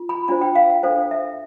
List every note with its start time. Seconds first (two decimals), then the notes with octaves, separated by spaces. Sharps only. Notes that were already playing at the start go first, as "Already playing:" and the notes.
Already playing: F4
0.09 B5
0.28 D4 F4 C5 B5
0.41 G5
0.55 F5
0.69 G5
0.83 D4 A4 C5 F5
1.11 E5